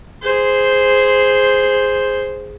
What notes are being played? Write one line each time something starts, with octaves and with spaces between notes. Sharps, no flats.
G#4 C5